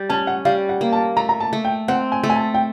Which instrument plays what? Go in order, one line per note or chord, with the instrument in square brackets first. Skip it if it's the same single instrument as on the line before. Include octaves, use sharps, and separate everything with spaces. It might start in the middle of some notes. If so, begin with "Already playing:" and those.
Already playing: [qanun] G3
[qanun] C#4 [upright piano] A5
[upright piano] F#5
[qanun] G3 [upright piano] F5
[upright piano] F#5
[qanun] A#3
[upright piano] A5
[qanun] A3 [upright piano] A#5
[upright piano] A#5
A5
[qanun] A3
[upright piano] G5
[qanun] C4 [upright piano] F#5
[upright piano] G#5
[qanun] A3
[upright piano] G#5
A5
G5